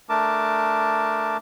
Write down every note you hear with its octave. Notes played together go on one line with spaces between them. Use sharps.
A3 D4 A#4 A5 D6